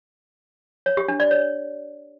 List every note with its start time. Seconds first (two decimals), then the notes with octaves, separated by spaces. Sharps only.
0.86 C#5
0.97 G4
1.08 D4
1.20 D5
1.31 C#5